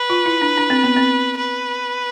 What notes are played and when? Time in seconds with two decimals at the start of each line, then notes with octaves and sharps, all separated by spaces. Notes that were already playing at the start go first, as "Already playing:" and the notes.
Already playing: B4
0.10 F4
0.26 E4
0.42 D4
0.58 D4
0.70 C4
0.83 B3
0.96 C4
1.37 B4